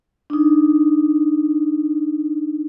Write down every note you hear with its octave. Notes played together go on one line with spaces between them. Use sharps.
D4 D#4